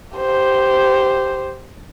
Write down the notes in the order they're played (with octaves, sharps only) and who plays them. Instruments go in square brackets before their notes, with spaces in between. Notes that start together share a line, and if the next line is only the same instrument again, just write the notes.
[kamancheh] G4 C5